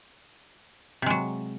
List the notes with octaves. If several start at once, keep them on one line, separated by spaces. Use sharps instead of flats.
C3 F#3 G#3